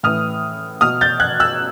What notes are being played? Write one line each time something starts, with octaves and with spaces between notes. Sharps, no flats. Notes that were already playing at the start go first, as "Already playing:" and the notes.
A2 E3 D#6 F6
B2 D#6 F6
G6 A6
F#6 G#6
E6 F#6